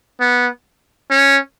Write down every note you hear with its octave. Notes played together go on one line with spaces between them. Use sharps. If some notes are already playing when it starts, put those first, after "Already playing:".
B3
C#4